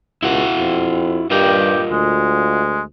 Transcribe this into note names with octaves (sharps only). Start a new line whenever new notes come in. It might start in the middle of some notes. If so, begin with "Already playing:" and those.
C#2 E4 F#4 F#5
F2
G2 F4 G4 A#4 D#5
D2 G#3